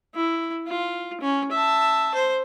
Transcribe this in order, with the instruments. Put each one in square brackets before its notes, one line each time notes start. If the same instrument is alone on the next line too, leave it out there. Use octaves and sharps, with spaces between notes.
[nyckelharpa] E4
F4
C#4
E5 A5
C5